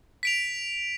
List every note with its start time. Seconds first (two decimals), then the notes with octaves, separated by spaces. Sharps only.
0.23 B6 D7 F7